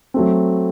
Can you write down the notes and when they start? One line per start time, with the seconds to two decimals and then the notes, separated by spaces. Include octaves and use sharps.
0.14 F#3 A3 C4